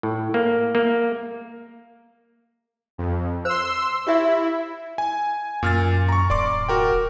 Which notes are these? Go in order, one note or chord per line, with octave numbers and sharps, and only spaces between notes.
A2
A#3
A#3
F2
C5 C6 E6
E4 G4 E5
G#5
F#2 A#2 F6 A6
A#5 C#6
D1 D5 C6 D6
F#4 A#4 G5